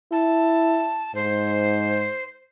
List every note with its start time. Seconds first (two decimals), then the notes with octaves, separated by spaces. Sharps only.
0.12 E4 A5
1.15 G#2 C5